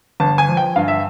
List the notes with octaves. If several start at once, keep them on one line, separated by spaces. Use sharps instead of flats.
G1 A5
G#5
F3
G5
G2 F5
E5